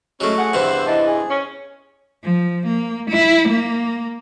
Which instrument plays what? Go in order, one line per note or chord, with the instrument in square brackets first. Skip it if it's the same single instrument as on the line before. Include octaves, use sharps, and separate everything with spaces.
[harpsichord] F#3 A3 [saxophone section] G#3 C#4 [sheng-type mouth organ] C#5
[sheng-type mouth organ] G#4 C#6 [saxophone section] F#5
[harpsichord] E2 G2 C3 [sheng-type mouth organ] C5 E6
[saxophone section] E3 D#5 [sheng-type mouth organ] A5
[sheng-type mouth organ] G#4
[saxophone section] C#4
[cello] F3
A#3
E4
A#3